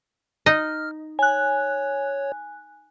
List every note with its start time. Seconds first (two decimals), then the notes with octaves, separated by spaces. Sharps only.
0.46 D#4 D#5 F6
1.19 C#5 G#5 F#6